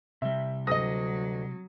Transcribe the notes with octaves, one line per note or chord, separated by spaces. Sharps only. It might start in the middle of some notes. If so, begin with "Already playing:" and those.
C3 G3 E5
D2 F#3 D#5 D#6 A#6